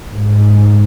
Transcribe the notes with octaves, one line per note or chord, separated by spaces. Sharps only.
G#2